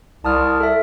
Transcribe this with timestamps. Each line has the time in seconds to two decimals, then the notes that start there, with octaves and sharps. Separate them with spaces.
0.24 C2 A5 D#6 F6
0.60 A4 E5